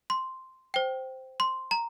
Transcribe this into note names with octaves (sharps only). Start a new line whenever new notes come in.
C6
C5 G5
C6
A#5